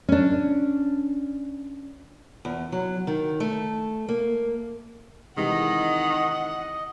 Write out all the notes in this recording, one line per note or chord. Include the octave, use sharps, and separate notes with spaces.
C#4 D4
E2
F#3
D#3
A3
A#3
C3 D#3 E3 G#3 D#5 F#5